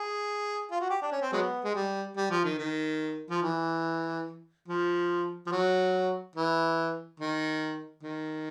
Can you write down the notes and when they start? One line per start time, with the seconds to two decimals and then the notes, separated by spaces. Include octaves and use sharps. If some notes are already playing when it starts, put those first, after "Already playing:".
Already playing: G#4
0.71 F4
0.81 F#4
0.90 G4
1.02 D4
1.12 C#4
1.22 C4
1.33 F#3 G#3 B3
1.64 G#3
1.75 G3
2.17 G3
2.30 F3
2.44 D#3
2.58 D#3
3.30 F3
3.42 E3
4.68 F3
5.46 F3
5.52 F#3
6.36 E3
7.20 D#3
8.03 D#3